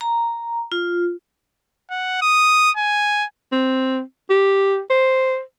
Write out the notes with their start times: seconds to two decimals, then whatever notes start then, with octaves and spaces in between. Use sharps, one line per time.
0.01 A#5
0.72 F4
1.90 F#5
2.22 D#6
2.77 G#5
3.52 C4
4.30 G4
4.90 C5